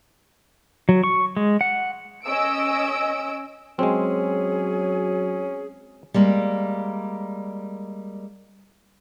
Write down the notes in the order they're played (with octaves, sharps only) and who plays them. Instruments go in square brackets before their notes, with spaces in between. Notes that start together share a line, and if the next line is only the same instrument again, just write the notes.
[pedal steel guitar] F#3
C#6
G#3
F#5
[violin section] C#4 D#5 E6 D7
[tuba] F#3 [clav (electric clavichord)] G#3 C4 [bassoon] C#4 [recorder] G#4
[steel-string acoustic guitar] G3 G#3 A#3